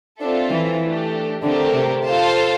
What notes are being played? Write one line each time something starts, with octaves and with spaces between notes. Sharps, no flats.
C4 D4 F4 A4 E5
E3
A3 D4 G4
D3 A3 C4 G4 A#4
C3
F4 A4 C5 F5 A5